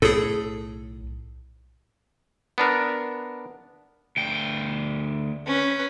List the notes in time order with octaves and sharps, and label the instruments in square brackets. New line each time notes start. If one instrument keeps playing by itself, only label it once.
[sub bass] B1 [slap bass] A2 [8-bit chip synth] G#4 A4
[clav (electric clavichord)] B3 D4 A#4
[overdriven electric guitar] D2 G5
[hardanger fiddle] C#4 B4